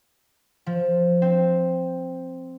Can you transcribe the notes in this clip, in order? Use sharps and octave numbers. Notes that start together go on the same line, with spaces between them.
F3
C4